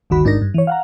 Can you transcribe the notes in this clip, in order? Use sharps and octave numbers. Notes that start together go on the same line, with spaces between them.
G1 D2 D#3 F#4 B5
A1 G#2 D4 D#4 A#4 A#6
G2
E3 C#5
F5 F#5 A#5